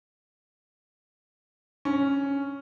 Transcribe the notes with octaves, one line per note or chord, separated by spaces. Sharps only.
C#4